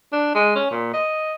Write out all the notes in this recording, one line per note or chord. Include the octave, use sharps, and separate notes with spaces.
D4
G#3
C#4
A#2
D#5